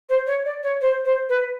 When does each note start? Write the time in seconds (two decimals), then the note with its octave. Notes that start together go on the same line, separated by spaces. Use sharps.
0.09 C5
0.27 C#5
0.45 D5
0.63 C#5
0.81 C5
1.05 C5
1.29 B4